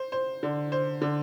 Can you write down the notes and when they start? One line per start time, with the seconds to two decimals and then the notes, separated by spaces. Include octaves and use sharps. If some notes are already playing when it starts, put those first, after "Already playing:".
Already playing: C5
0.12 C5
0.43 D3
0.72 C5
1.02 D3